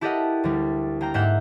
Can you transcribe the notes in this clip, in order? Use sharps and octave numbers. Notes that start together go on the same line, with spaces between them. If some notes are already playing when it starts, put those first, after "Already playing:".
E4 G4 A4 A#4 D#5 F#5
D2 G3
A#3 G5 A#5
G#2 A#3 E5 F#5 G6